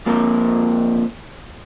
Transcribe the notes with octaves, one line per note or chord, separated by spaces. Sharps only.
F3 A#3 C4 A#4